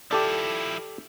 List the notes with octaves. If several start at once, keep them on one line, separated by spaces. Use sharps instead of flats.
F3 E4 G4 A4 D5